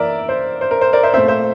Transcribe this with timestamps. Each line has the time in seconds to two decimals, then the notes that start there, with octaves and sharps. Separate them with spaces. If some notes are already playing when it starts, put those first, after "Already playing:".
Already playing: E3 A#3 A#4 D5 E5
0.29 C5
0.61 C5
0.71 A#4
0.81 C5
0.93 A#4 D5
1.03 C5 E5
1.13 A#2 A3 C4 C5 E5
1.28 C5 E5